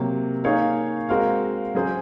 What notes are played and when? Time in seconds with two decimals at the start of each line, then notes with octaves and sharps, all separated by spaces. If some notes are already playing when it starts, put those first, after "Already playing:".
Already playing: C3 F#3 A#3
0.44 A#3 D#4 G#4 C#5 F5
1.09 G#3 C4 F#4 A#4 F5
1.75 F#3 C#4 G#4 C5